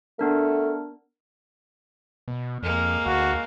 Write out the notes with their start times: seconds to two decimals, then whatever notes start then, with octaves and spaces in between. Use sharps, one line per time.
0.19 A3 B3 D4 A#4
2.28 B2
2.63 F2 G#3 A#3 F6
3.06 D2 F#4 F5